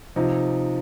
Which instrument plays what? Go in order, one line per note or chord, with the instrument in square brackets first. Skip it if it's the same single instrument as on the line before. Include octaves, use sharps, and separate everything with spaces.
[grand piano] C3 F3 D#4